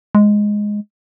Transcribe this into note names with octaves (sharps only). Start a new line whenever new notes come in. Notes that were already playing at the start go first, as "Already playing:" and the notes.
G#3